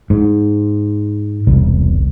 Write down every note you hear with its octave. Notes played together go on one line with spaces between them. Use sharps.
G#2
E1 C2